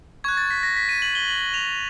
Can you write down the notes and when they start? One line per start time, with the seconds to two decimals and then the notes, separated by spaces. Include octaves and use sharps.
0.24 C#6 F#6 G#6
0.37 A6
0.50 B6
0.63 A#6
0.76 B6
0.89 D#7
1.02 F#7
1.15 G7
1.28 F#7
1.54 F7